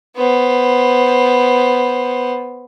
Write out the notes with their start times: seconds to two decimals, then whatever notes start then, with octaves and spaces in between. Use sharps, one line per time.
0.17 B3 C5